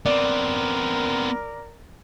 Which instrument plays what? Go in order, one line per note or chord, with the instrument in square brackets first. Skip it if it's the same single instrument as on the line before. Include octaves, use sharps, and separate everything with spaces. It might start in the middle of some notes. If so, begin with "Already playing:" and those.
[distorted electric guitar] B3 C4 [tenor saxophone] A#4 [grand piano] D5